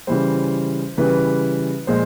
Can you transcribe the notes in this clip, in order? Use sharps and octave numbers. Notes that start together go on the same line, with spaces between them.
C#3 E3 G3 C5
C#3 E3 G3 B4
A#2 F3 G#3 C5